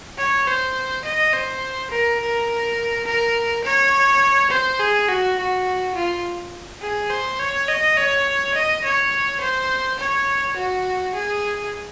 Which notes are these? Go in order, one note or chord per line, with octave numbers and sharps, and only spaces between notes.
C#5
C5
D#5
C5
A#4
A#4
A#4
C#5
C5
G#4
F#4
F#4
F4
G#4
C5
C#5
D#5
C#5
D#5
C#5
C5
C#5
F#4
G#4